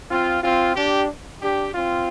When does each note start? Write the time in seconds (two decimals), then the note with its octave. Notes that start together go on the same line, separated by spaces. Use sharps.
0.10 C4 F4
0.43 C4 F4
0.76 D4 G4
1.42 D4 G4
1.74 C4 F4